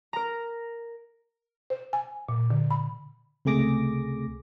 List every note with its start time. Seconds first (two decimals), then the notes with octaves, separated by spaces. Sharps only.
0.13 A#4 A#5
1.70 C5
1.93 G#5
2.29 A#2
2.51 D3
2.71 B5
3.45 C#2 C3 A3 G#4 D6 A#6